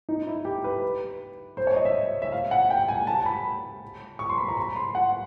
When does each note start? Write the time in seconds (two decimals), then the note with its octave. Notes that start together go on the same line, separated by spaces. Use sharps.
0.09 D#4
0.27 E4
0.45 G4
0.64 B4
1.57 C5
1.67 C#5
1.76 D#5
1.85 E5
2.22 E5
2.32 F5
2.51 F#5
2.70 G5
2.88 G#5
3.07 A5
3.26 B5
4.19 C#6
4.29 C6
4.38 B5
4.48 A#5
4.57 B5
4.76 C6
4.95 F#5